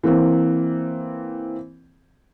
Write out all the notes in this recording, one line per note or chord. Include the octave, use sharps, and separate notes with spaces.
E3 A#3 C4